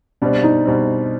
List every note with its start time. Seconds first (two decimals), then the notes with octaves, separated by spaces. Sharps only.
0.22 B2 G3 C4 D4
0.43 D#4
0.65 B2 G3 C4